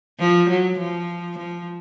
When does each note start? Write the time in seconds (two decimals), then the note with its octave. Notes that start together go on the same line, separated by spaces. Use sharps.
0.20 F3
0.50 F#3
0.79 F3
1.38 F3